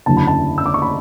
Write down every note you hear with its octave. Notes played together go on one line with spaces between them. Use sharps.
F#1 E2 D3 F#3 A5
B5
A5
E6
D6
C#6
B5